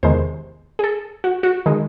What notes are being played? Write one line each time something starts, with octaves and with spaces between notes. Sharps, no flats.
E2 C3 D#3 G#3 C5
G#4
A4
F#4
F#4
D#3 G#3